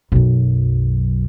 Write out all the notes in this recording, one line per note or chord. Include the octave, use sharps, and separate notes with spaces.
B1 F#2